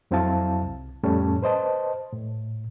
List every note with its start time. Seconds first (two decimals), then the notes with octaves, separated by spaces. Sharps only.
0.11 F2 F#3 C4 E4 F5 A5
0.62 C2
1.03 F2 A2 G3 A3 C#4 A5
1.42 B4 C5 D#5 A5
2.12 A2